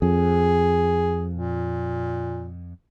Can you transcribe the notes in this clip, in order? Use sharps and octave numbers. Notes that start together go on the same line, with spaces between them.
F2 G#4
A#2